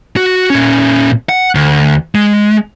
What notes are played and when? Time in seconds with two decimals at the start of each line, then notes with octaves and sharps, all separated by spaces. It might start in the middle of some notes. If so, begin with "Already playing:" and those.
0.17 F#4
0.50 A#2 C#4
1.29 F#5
1.55 D2
2.15 G#3